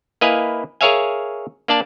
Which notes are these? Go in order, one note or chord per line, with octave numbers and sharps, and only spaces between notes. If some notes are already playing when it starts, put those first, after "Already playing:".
A#3 E4 B4 D#5 F5 G#5
G#4 A#4 C#5 E5 F5 G#5
A#3 D4 D5 A5